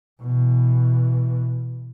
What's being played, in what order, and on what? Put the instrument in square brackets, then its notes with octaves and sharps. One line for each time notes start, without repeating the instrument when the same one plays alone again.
[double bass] B2 E3